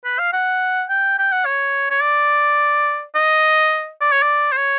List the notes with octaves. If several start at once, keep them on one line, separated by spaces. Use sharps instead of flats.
B4
F5
F#5
G5
G5
F#5
C#5
C#5
D5
D#5
D5
C#5
D5
C5
C#5